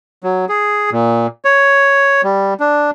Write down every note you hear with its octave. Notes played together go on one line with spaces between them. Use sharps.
F#3
G#4
A#2
C#5
G3
D4